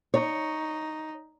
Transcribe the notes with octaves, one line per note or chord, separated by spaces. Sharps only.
D#4 C#5